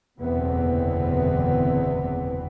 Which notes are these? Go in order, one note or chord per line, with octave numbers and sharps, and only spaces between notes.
F#1 E2 B2 D3 B3 C4